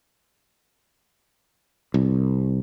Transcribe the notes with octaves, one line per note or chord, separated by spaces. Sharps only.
C2